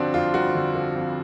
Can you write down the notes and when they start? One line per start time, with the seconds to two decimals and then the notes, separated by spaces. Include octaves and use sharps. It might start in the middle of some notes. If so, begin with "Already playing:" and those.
Already playing: G1 D3 F3 C4 D4 F#4
0.14 F2 F4
0.34 G1 F#4
0.55 D3
0.75 F3
0.96 F2